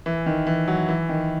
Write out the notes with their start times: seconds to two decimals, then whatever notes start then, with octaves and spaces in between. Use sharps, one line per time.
0.06 E3
0.26 D#3
0.47 E3
0.68 F#3
0.88 E3
1.09 D#3